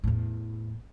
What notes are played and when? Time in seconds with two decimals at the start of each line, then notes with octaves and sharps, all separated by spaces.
0.04 E2 A2